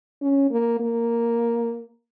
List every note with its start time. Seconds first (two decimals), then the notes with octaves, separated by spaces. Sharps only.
0.22 C#4
0.51 A#3
0.80 A#3